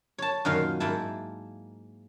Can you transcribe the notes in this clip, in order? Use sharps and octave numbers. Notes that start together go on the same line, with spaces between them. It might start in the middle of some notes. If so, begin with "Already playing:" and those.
C#5 A5
F#2 A#2 D#3 F5 C6
G#2 A#3 E4 A5